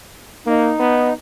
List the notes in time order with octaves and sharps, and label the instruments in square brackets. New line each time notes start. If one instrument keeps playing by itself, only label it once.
[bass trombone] A#3 [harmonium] D#4
[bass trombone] B3